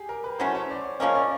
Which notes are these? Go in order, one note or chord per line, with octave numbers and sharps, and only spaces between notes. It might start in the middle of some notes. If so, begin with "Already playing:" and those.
Already playing: G4 G#4
A#4
B4
F#3 A3 C#4 E4 C5
C#5
D5
C#3 F3 A#3 C#4 D#5
D5